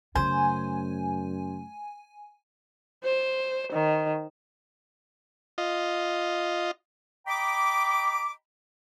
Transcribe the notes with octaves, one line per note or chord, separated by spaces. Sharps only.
F#2 C#3 A3 C5 G#5
C5
D#3
F4 D#5
D#5 G5 A#5 B5 D6